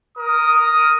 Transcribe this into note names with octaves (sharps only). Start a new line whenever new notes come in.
A#4 D#6